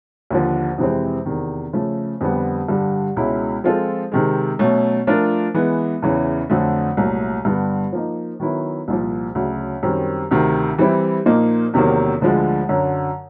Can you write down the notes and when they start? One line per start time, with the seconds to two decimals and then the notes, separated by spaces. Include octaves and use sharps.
0.30 D#2 D3 F3
0.78 F2 C3 E3 G#3 C4
1.26 E2 C3 D#3
1.73 C#3 F3 A3
2.21 F2 D3 G3 B3
2.69 G2 D3 G3
3.16 C#2 B2 G#3 C#4 E4
3.64 F3 G#3 C4 F4 A4
4.12 C3 D#3 G#3
4.59 B2 F#3 A3 C#4
5.07 F3 A3 D4 F4 A#4
5.54 E3 G#3 B3
6.02 E2 C#3 E3
6.50 F2 D3 F#3 A3
6.97 C2 A#2 F#3 A3
7.45 G2 D3 G3 B3
7.93 F3 A#3 D#4
8.40 D#3 F#3 B3 E4
8.88 C2 A#2 F3
9.35 D2 C#3 F#3
9.83 F#2 D#3 G3 C4
10.31 D2 C3 D#3
10.78 E3 G3 C4 E4
11.26 A#2 F3 A#3 D#4
11.74 E2 C3 D#3 F#3 A#3
12.21 D2 D3 F3 G#3
12.69 F#2 D3 F#3